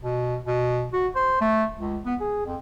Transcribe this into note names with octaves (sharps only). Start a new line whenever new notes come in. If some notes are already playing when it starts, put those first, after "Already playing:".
B2
B2
F#4
C5
A3
C#2
B3
G#4
F2